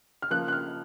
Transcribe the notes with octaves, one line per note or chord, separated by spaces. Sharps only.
F6
C#3 F3 A#3 F#6
F#6
F6